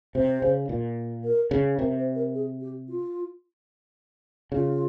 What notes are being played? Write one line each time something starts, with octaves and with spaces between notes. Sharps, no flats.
C3 C5
C#3
A#2
A#4
C#3
C3 A#4
C5
A#4
G#4
G4
F4
C#3 F4